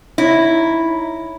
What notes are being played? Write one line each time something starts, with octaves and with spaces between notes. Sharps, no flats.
D#4 E4 C#5 A#6